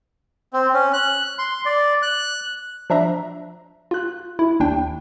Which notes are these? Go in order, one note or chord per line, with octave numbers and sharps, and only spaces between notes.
C4
C#4
F#6
C6
D5
F#6
F3 D4 E5 A#5
F4 F#6
E4
D#2 D4 G5